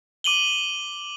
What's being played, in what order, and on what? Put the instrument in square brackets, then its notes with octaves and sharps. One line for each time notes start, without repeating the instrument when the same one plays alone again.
[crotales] D6 D#7 F#7 G7